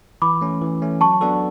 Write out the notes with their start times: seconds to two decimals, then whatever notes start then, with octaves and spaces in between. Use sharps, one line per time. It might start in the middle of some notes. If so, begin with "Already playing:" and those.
0.22 E3 B5 D6
0.41 A3 C#4
0.61 E3
0.82 A3 C#4
1.01 F#3 A5 C#6
1.21 B3 D4 F#4 A4